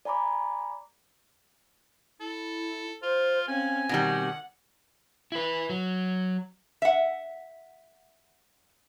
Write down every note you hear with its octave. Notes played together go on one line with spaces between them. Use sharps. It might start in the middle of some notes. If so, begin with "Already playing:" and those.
D5 G#5 A#5 B5 D6
E4 A4
F4 C5
C4 C#4 F5 G#5
B2 D#3 G3 F#5
E4 B4
F#3
E5 F#5